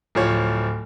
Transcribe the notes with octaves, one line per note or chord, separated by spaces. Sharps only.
D1 F3 C#5